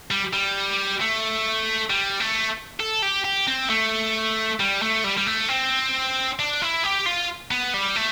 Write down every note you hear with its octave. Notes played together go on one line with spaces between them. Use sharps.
G3
G3
A3
G3
A3
A4
G4
G4
C4
A3
G3
A3
G3
G3
A3
C4
D4
E4
G4
F4
B3
G3
A3